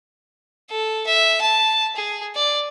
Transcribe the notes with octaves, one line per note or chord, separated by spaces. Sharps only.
A4
E5
A5
G#4
D5